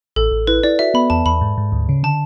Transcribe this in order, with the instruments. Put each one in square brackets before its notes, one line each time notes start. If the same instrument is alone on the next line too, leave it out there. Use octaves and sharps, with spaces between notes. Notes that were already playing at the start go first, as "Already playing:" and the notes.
[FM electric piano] A1 [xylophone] A4
[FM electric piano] A1
[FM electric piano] E4 [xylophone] B4
[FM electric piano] E4 [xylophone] D5
[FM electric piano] F#4 [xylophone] E5
[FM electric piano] B3 [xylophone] B5
[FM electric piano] E2 [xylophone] A5
[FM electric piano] E2 [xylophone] B5
[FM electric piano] G#2
G#2
D2
C#3
[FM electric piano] D3 [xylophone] A5